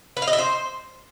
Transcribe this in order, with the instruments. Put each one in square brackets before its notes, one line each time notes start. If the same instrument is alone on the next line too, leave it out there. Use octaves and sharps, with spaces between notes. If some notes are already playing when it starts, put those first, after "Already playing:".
[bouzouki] B4
F5
D#5
E5
C5